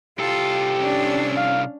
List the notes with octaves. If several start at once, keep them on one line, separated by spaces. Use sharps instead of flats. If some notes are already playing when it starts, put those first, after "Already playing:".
C2 F4 G4 A4
C#4 D4
F5